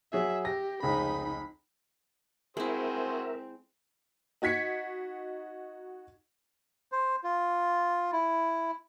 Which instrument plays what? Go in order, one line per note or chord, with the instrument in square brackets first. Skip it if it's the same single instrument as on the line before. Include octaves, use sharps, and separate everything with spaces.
[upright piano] F#3 G#4 [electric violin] E5
[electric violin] G4 [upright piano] A#6
[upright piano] F1 C#2 G#4 [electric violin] D#4 B5
[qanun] G#3 E4 [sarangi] C4 [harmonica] F#4 G#4 C5 [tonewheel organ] A#4 E5
[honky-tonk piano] D#4 F#4 G#6 B6 C#7
[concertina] C5
F4
E4